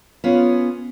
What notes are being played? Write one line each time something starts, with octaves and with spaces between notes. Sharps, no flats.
B3 C#4 F4